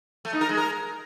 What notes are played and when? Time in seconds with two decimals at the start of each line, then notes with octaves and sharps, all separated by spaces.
0.25 A3
0.33 D#4
0.41 A#4
0.49 G#3
0.57 A#4